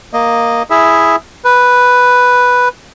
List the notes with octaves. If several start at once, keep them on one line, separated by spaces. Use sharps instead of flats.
A#3 D#5
E4 G#4 E5
B4